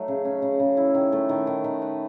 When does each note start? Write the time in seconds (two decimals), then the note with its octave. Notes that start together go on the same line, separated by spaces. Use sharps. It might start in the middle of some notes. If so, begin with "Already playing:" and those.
Already playing: F#3 A3 D#4
0.08 C#3
0.25 C#4
0.42 C#3
0.60 C#3
0.77 E4
0.95 D#3
1.12 A3
1.29 D#3
1.47 D#3
1.64 D#3
1.82 B4